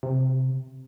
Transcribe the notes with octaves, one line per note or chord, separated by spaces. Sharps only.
C3